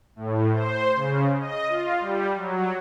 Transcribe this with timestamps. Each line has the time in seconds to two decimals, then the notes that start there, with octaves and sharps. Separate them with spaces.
0.16 A2
0.52 C5
0.95 C#3
1.40 D#5
1.69 F4
2.00 G3
2.36 F#3